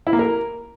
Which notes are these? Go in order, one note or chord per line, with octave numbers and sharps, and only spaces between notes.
E4
A#3
A#4